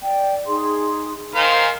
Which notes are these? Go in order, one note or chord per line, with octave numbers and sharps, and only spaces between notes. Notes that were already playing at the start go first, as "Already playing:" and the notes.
D5 G5
D#4 G#4 C6
D#3 C5 F5 G#5 A#5